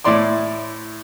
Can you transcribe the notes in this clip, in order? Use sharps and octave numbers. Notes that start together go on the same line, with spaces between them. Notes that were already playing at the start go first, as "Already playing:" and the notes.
A2 E4 D5 C6 D6